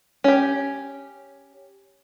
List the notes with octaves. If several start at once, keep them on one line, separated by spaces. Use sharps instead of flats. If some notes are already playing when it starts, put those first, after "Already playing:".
C#4 G4